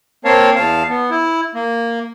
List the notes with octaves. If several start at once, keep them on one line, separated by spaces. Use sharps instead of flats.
A#3 C4 A#4 C#5 F5 A5
E2 F5 A5
B3
E4
A#3